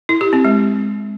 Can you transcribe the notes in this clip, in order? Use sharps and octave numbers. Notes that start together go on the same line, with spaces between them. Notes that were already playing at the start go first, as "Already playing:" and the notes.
E4
G4
C4
G#3